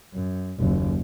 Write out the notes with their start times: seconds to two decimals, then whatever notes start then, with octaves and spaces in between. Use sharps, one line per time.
0.14 F#2
0.59 F#1 D#2